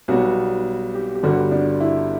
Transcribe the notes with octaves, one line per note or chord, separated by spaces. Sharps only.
B1 B2 G3 B3 F#4
G4
G4
G1 G2 D3 G3 F#4
D4
E4